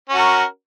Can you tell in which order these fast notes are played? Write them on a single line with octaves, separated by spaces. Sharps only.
C#4 F#4 A#4